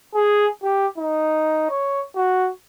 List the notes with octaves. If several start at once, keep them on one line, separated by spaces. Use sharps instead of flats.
G#4
G4
D#4
C#5
F#4